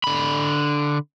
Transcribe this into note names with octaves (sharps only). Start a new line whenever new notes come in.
D3 B5